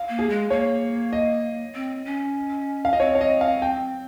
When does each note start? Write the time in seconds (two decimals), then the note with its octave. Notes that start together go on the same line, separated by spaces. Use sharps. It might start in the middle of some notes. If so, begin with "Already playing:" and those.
Already playing: F5
0.09 A#3
0.19 G#4
0.30 G#3
0.50 A#3 C#5
1.13 D#5
1.75 C4
2.05 C#4
2.85 F5
2.93 D#5
2.99 C4 C#5
3.15 C#5
3.21 D#5
3.41 F5
3.62 G5